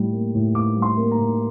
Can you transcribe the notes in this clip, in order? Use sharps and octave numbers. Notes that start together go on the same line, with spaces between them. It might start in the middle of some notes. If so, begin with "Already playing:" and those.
Already playing: A2 G3
A#3
A2
A2 D6
G3
C6
A#3
A#5
A2